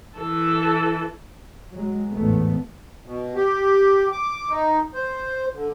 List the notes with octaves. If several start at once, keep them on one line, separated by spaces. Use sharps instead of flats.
E3 A4
F#3 G#3
A1 E2 G#2 A3 B3
B2
G4
D6
D#4
C5
D3